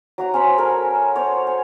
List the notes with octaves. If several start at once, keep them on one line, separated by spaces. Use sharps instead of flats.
F#3 F#4 A#5
C#4 C5 C#5 B5
A4 A#4 C#5 G#5
C5 C#5
G#5